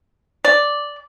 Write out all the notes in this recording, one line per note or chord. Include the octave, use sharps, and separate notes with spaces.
D5